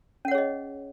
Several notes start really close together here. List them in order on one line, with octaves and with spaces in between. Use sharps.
C#4 F#5 C#5 G#4 D#5